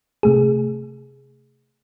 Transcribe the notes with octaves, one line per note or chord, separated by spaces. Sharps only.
C3 A3 G#4